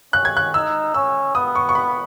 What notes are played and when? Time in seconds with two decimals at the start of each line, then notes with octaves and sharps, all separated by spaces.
0.13 C#4 F#6
0.25 G#6
0.37 F#6
0.54 D#4 E6
0.94 C#4 E6
1.35 B3 D#6
1.55 C#6
1.69 C#6
1.75 B5